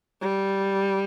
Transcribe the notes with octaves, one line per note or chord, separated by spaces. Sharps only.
G3